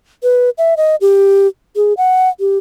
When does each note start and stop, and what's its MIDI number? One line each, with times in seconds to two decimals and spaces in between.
0.23 0.50 71
0.58 0.74 76
0.77 0.96 75
1.01 1.47 67
1.76 1.93 68
1.97 2.29 78
2.40 2.58 67